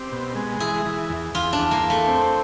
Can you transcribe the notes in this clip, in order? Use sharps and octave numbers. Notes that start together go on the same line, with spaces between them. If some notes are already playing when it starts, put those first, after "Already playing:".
Already playing: C4 G4
B2
G#3
E3 G#4
E3
E2
E2 F4
D4
E2
A#3
E2
A3
C4